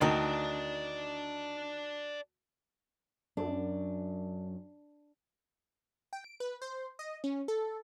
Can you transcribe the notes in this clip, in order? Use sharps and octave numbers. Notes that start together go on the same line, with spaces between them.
D2 D#3 D#4 D5 A5
F#2 D4
G5
D7
B4
C5
D#5
C#4
A4